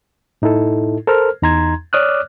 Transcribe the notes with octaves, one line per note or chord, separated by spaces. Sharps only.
A2 D#4 E4 A4
A4 A#4 C5 F6
E2 D#4 A#5 C6 G#6
C#5 D5 D6 D#6 F6 F#6